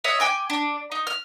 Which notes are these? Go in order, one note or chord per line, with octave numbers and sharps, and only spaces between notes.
C#5 D#5 E5
G5 G#5 D6
D4
D#4
F6